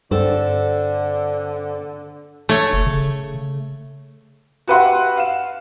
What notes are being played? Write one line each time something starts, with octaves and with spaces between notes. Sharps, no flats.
G2 D3 C4 A4
A3 C#5
F1
C#3
F#4 G4 B4 E5 F#5 C6
F5 E7